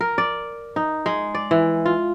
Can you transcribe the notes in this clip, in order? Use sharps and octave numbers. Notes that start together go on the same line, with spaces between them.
A#4
D5
D#4
G#3
D5
E3
F4